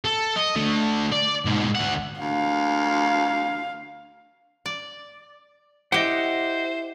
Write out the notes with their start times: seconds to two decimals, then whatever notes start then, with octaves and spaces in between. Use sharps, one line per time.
0.05 A4
0.36 D#5
0.56 D3 A3
1.12 D5
1.45 G#2 B2
1.75 D2 F#5
2.20 D2 F5
4.66 D5
5.92 E4 G4 C5 D#5 E5 F#5 G5